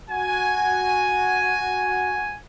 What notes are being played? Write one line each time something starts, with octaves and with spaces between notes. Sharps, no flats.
F#4 G#5